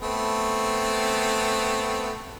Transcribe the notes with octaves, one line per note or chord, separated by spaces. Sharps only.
A3 B3 C4